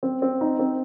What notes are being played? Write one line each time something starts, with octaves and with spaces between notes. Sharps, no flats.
C4
C4
D#4
C4